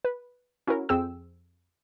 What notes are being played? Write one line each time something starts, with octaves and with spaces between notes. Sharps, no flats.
B4
C#4 E4 F#4 A#4
F2 C4 G#4 G5 E6